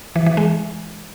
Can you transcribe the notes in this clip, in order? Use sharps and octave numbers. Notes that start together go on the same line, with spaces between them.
E3
E3
G#3